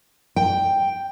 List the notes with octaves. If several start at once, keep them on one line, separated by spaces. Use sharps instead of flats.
G5